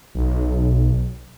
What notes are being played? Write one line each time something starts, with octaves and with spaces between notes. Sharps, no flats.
B1